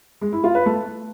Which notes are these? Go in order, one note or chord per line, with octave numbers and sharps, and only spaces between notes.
G#3
E4
F4
B4
A3